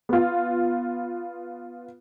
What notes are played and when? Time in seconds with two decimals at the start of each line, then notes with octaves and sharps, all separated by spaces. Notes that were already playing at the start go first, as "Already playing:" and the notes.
0.09 B3 F4